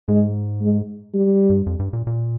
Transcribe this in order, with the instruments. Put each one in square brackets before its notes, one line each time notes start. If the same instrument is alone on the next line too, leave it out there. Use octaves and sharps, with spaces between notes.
[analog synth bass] G#2 [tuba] G#3
[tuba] G#3
G3
[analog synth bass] G2
F2
G2
A#2
A#2